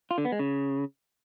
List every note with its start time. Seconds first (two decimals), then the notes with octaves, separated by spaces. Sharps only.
0.11 F4
0.18 D3
0.25 B3
0.32 G#3
0.39 C#3